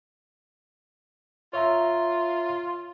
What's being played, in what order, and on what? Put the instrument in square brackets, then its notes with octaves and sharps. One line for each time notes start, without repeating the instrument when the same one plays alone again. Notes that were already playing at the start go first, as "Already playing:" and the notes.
[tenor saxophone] F4 [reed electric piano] C#5 E5 A#5